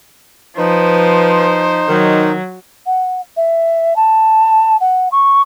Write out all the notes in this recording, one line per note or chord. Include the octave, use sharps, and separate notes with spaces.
F3 D#4 B4 C5
D#3 F#3
F#5
E5
A5
F#5
C#6